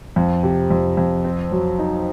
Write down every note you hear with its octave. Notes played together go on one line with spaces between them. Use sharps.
F2
C3
F2
F2
C4
F#3
D#4